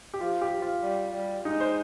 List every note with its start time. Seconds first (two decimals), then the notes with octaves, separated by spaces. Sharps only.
0.14 G4
0.20 F3 F4
0.42 G4
0.62 F4
0.83 G3
1.14 G3
1.45 G#3 D#4
1.60 C5